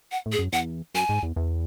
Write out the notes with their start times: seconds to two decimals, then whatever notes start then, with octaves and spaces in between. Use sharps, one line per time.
0.11 F#5
0.26 A2
0.32 G#4
0.39 F#2
0.53 E2 F#5
0.94 F#2 G#5
1.09 G#2
1.23 E2
1.36 E2